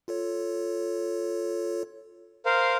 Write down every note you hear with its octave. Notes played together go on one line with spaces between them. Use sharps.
F4 A4 C#5
A#4 C5 F5